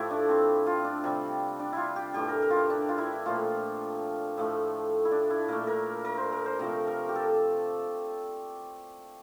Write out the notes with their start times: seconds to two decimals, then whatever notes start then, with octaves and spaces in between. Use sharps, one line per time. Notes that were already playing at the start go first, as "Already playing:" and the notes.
Already playing: A2 F3 A3 E4 G4 A4
0.11 D4
0.29 C4
0.67 F4
0.84 D4
1.04 C3 G3
1.59 D4
1.73 E4 F4
1.96 G4
2.14 A2 E3 A3 G4
2.28 A#4
2.42 A#4
2.50 F4
2.57 E4
2.70 D4
2.89 F4
2.98 E4
3.26 A#2 F3 A3 F4
4.38 A2 F3 A3
5.05 E4
5.11 D4
5.30 E4
5.48 A#2 A3 A#4
5.67 A#4
6.05 A#4
6.18 C5
6.32 A#4
6.46 C5
6.59 C3 F3 A3 A#4
6.87 A#4
7.09 G4
7.15 A4